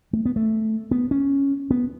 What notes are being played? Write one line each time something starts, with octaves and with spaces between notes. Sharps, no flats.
A3
B3
A3
B3
C#4
B3